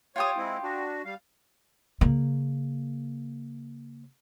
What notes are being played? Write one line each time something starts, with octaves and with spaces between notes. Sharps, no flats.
F4 G4 C#5 C#6 D#6
G#3 C4 E4
D4 F#4
G3 F5
C#3 A#3